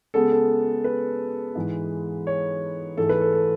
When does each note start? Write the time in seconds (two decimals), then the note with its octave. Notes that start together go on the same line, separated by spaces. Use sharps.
0.14 C#3 G#3 B3 A4
0.32 A4
0.84 B4
1.55 G#2 E3 G#3
2.27 C#5
2.97 G#2 E3 A3 A4
3.09 B4
3.21 A4
3.32 A4